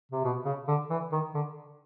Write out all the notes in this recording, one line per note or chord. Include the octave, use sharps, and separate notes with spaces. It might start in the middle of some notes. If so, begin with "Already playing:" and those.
C3
B2
C#3
D3
E3
D#3
D3